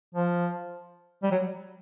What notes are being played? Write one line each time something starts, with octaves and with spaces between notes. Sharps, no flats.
F3
G3
F#3